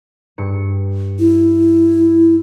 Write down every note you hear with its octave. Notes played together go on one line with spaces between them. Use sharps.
G2 C#7
E4